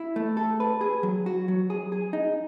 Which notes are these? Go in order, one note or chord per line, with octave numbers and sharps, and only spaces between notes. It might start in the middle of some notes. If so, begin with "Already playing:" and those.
Already playing: E4
A3
A4
B4
G#4
F#3
F#4
F#3
G#4
G#4
D#4